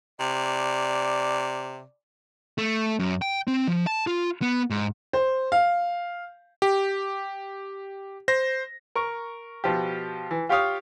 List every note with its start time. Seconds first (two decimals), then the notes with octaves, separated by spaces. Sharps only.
0.20 C3 D5
2.58 A3
2.99 F#2
3.22 G5
3.48 C4
3.68 F3
3.87 A5
4.07 F4
4.42 B3
4.70 G#2
5.13 C5
5.52 F5
6.62 G4
8.28 C5 A#6
8.95 A#4 C#6
9.64 B2 F3 G4
10.31 E3
10.49 F4 G4 C#5 F5 D#6